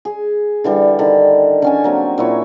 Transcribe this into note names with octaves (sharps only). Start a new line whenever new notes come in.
G#4
D3 E3 G3
D3 D#3
D3 C#4 G#5
F#3 A#3 C4
A#2 E4 C#5